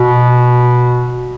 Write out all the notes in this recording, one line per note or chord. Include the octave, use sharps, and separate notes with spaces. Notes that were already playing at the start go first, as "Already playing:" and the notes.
Already playing: B2